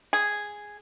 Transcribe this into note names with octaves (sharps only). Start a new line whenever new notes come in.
G#4